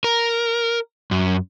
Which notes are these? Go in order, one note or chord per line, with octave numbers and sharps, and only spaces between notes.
A#4
F#2